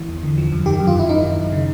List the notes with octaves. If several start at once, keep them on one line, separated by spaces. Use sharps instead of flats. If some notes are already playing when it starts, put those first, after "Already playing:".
Already playing: E3
E2
D3
F3
F#2
D#3 G4
F#2
F4
F#2 E4
D#3 D#4
F#2
F#2
C#3